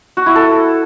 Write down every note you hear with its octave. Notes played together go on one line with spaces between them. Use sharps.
F#4
E4
A4